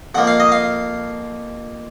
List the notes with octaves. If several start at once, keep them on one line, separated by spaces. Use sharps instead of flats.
F2 F3 A#3 F#5
F5
D#5
F5